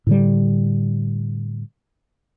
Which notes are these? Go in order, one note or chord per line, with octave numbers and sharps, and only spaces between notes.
A2 D3 G3